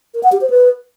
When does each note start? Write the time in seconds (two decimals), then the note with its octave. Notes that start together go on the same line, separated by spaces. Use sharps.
0.14 A#4
0.23 F#5
0.32 G4
0.41 C5
0.50 B4